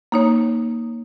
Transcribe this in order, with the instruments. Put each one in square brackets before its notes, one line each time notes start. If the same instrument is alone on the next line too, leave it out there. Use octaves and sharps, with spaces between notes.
[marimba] A#3 D#4 C#5